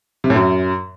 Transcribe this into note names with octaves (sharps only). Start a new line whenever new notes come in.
C3
A2
F#2